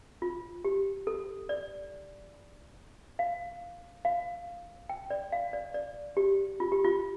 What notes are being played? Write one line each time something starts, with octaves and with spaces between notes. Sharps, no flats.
F4
G4
A4
D5
F5
F5
G5
D5
F5
D5
D5
G4
F4
G4
F4